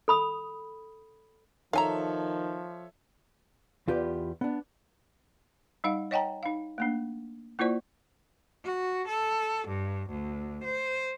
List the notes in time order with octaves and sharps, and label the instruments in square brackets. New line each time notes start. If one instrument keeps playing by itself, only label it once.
[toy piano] A4 B5 D#6
[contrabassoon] D#3 [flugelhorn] F3 [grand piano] A4 C#5 E5 [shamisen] F5 G#5 A#5
[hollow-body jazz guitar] E2 F4 G4 B4 D5
B3 D4
[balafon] G3 D#4 F5 F#5
C#5 D#5 F#5 G5 A5 A#5
D#4 F5
A3 A#3 D4
A#3 E4 F4 C5 D5
[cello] F#4
A4
G2
D2
C5